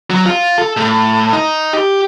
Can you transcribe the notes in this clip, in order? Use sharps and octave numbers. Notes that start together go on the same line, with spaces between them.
F#3
F4
A4
A2
D#4
G4